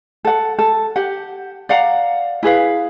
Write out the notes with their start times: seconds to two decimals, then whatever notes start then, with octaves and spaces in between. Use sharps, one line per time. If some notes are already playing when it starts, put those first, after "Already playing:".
0.25 A4 F#5
0.59 A4
0.96 G4 F#5
1.69 D5 F5 F#5 A#5
2.43 E4 G#4 B4 F5